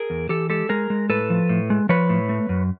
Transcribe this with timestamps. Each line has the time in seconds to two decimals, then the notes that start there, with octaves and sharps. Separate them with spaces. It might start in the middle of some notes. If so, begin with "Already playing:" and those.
Already playing: G#4 A#4
0.10 E2
0.29 E3 G4 A4
0.49 G#3 G4 A4
0.69 G#3 G#4 A#4
0.90 G#3
1.09 A2 A4 B4
1.30 F3
1.49 A2
1.70 G#3
1.89 F3 B4 C#5
2.09 A2
2.29 A3
2.49 F#2